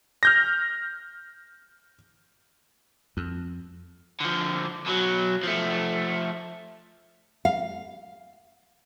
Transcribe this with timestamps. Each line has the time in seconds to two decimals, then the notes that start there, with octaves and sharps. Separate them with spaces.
0.23 F6 G6 A#6
3.17 F2
4.21 D3 F3
4.87 B2 F#3
5.43 F3 A3
7.45 F5